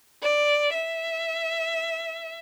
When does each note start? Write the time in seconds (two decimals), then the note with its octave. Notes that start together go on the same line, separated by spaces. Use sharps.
0.23 D5
0.74 E5